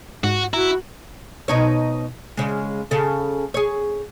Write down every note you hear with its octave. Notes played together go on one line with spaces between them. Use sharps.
G#2 F#4
E4 F#4 A#5
B2 D#4 C#5
C#3 G#3
C#3 A4
G#4 C#5